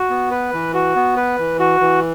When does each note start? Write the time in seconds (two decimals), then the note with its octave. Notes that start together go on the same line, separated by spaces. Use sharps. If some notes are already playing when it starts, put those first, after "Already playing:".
Already playing: F#4
0.10 B3
0.31 B4
0.53 E3
0.74 F#4
0.96 B3
1.16 B4
1.39 E3
1.59 F#4
1.80 E3